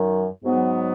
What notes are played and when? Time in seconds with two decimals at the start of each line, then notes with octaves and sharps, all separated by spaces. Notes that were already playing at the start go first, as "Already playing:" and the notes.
Already playing: F#2 D#3 F#3
0.43 G#2 F#3 B3